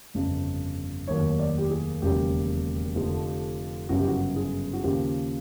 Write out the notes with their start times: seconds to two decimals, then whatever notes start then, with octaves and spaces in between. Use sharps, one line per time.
0.14 G1 F2 C#3
1.08 F1 D#2 D#3 F#3 C#5
1.39 D5
1.58 G4
1.70 G#4
2.02 E1 D#2 C#3 F#3 G4
2.95 F1 F2 D3 F3
3.89 G1 F#2 C#3 F#3 F#4
3.98 G4
4.08 F#4
4.36 G#4
4.73 F#4
4.83 D#2 C#3 F3 G4